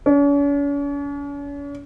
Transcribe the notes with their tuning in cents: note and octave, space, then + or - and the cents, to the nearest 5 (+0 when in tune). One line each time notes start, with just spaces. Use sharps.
C#4 +45